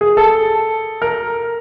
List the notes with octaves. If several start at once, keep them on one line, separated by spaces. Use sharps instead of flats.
G#4
A4
A#4